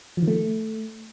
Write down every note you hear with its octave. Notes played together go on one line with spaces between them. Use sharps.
F3
D#3
A3